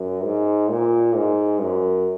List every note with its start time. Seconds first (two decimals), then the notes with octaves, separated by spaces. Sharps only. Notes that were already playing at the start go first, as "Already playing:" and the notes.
Already playing: F#2
0.25 G#2
0.70 A#2
1.16 G#2
1.61 F#2